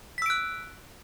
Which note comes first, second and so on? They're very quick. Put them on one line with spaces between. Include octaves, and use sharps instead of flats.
B6 E6 D7 F#6